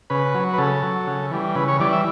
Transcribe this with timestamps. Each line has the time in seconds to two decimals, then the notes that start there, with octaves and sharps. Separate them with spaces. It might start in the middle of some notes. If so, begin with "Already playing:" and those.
0.10 C#3 B4
0.35 F#3
0.54 B4
0.58 C#3 A4
0.83 F#3
1.07 C#3
1.31 E3 G3
1.55 C#3 B4
1.68 C#5
1.80 E3 G3 D5
1.93 E5